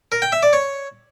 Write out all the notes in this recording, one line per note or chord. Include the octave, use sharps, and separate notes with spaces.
A#4
G5
E5
D5
C#5